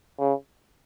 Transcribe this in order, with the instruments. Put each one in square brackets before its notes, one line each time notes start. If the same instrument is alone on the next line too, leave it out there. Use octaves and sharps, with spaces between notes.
[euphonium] C#3